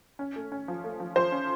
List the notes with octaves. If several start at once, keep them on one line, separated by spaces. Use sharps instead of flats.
C#4
A3
C#4
F3
A3
F3
F3 C5
C#4